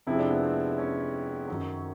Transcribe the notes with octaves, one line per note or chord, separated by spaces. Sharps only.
F2 C3 F3 G#3 E4
D4
B3
C4
C#4
F#2 D#3 F#3